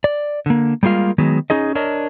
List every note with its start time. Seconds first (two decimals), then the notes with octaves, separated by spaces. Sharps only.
0.04 D5
0.46 D3 A#3
0.83 G3 G#3 A#3 F4 F5
1.18 D#3 F#3 G#3 B3
1.50 C#4 D#4 G#4 D#5
1.75 D4 A#4 C#5 D#5